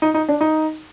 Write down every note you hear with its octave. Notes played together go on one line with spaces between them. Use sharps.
D#4
D#4
D4
D#4